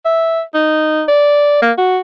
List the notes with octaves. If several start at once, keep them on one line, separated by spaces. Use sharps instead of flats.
E5
D#4
D5
A#3
F#4